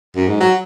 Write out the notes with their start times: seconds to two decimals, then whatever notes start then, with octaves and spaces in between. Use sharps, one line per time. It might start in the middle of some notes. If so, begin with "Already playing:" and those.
0.16 F#2
0.28 G#2
0.40 F#3